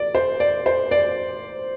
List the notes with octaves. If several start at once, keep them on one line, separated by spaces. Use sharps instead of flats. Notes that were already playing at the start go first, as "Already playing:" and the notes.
Already playing: D5
C5
D5
C5
D5